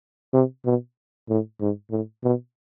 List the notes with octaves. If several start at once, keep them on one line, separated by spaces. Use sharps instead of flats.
C3
B2
A2
G#2
A2
B2